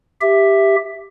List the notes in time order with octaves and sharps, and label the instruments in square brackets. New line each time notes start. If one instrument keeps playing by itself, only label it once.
[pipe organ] G4 E5